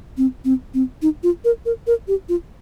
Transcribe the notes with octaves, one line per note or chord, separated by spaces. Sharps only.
C4
C4
C4
D#4
F4
A#4
A#4
A#4
G4
F4